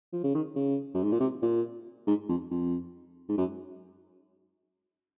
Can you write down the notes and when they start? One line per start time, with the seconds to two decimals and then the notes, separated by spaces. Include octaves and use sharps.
0.13 F3
0.24 C#3
0.34 D#3
0.56 C#3
0.94 F#2
1.03 G#2
1.12 A#2
1.20 C3
1.42 A#2
2.07 G#2
2.29 F2
2.51 F2
3.29 G#2
3.38 F#2